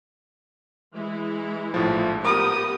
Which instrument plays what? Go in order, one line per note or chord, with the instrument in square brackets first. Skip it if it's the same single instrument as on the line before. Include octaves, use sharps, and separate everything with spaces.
[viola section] E3 G#3 E4
[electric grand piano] A#1 A2 F3
[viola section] B3 G4 [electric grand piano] A#4 [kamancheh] D#6